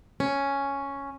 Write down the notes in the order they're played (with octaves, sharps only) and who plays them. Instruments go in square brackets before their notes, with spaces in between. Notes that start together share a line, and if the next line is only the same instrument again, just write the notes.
[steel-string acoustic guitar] C#4